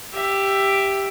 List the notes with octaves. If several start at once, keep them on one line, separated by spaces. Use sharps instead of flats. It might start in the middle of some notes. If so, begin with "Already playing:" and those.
G4 E5